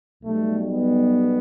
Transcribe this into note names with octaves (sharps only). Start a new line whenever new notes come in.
B1 B2 G3 A3
B3